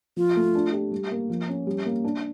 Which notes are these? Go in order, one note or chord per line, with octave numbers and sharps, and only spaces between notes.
F3 F4
A3
D4
G4
G3
A#3
F3
C#4
G3
A#3
D4